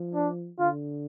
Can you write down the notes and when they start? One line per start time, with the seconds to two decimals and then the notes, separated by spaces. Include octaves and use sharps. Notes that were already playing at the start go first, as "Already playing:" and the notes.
Already playing: F3
0.14 D4
0.59 D3 F4